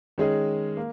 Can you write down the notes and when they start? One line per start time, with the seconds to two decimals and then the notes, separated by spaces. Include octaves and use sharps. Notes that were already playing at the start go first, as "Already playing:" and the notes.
0.18 D#3 G#3 C#4 G#4 D#5
0.77 A#3